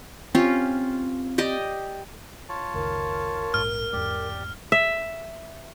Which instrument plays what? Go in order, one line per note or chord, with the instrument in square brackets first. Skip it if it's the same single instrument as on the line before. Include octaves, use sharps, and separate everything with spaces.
[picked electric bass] C4 [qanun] C#4 F4 G4
[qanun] G4 D5 D#5
[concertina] F4 C#5 A5
[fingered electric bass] F#1 C#2 D#3 [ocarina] A#4
[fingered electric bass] A#1 G#2 [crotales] F6
[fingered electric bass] E2 G#2 G#3 [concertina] G4 D5
[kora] E5